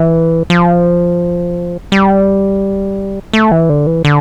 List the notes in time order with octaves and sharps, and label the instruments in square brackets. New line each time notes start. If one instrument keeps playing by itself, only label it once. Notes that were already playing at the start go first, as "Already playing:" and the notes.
Already playing: [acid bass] E3
F3
G3
A3
E3
D3
E3
D3